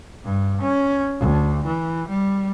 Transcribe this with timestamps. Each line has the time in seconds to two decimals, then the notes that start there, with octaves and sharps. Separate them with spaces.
0.25 G2
0.62 C#4
1.20 D2
1.66 E3
2.09 G3